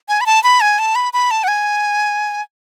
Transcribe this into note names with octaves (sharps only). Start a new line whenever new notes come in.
G#5
B5
A5
B5
G#5
A5
B5
B5
A5
F#5
G#5